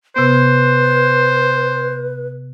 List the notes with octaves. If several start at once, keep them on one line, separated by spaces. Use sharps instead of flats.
C3 B3 B4 C5